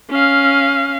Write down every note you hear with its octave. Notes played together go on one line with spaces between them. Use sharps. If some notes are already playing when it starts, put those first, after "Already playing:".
C#4 F5